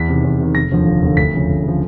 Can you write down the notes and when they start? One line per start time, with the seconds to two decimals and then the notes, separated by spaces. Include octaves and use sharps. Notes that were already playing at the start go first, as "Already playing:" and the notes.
Already playing: E2 B6
0.08 C3 D#3
0.24 E2
0.40 C3 D#3
0.55 F1 A#6
0.71 D#2 D3 F3
0.87 F1
1.02 D#2 D3 F3
1.17 D2 B6
1.34 C#3 F3
1.49 D2
1.64 C#3 F3